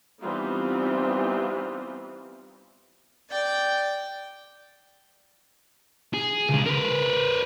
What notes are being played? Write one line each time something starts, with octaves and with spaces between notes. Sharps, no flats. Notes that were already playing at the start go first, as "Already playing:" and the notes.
E3 G3 B3 C4 D#4 F4
D5 G5
G#4
C#2 C#3
A#4 B4